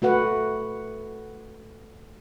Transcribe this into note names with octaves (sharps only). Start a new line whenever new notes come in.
A3 F#4 B4 F#5